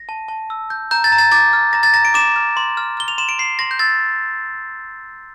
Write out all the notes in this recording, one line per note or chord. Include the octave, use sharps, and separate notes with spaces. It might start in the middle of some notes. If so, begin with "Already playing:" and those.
Already playing: A#6
A5
A5
E6
G6
A#5 G6
A6
A#5
A6
D6 A6
F6
A#5 A#6
A6
A#5 A#6
D7
D6 E7
F6
C6
F6
F6 G7
F7
C6 E7
D7
C6 C7
C6 A#6
G6
E6 A6